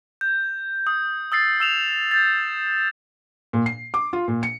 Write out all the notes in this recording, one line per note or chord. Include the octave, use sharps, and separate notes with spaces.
G6
D#6
D#6 E6 A6 C7
E6 E7 F7
G6 A6
A#2
C7
D6
F4
A#2
C#7